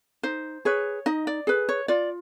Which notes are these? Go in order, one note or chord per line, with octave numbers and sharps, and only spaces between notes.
D#4 C5
G#4 B4 C#5
D#4 D#5
D5
G#4 B4
C#5
F4 D5